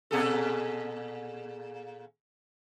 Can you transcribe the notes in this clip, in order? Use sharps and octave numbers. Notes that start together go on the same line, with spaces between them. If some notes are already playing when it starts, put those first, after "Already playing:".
A#2 G#4 A4